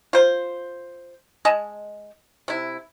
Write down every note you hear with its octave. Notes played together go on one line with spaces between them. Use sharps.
F4 C5
G#3 D#5 G#5 A5
C3 E4